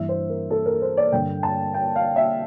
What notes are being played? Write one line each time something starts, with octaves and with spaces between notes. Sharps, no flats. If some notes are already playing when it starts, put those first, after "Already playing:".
Already playing: G2 E3 E5
C5
A#4
A4
A#4
C5
D5
G2 D3 G5
A5
G5
F5
E5